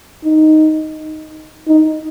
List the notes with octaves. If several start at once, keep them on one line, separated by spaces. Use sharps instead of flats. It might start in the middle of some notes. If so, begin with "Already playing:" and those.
D#4
D#4